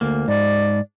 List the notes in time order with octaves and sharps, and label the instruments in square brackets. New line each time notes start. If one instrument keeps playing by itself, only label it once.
[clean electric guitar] D2 A#3
[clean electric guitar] G#2 [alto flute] D5